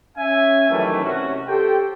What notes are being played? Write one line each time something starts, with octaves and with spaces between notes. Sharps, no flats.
C#4 E5 G#5
F#2 D#3 E3 F#3 G3 A3
C3 C#4 F#4
G4 A4 C5 G5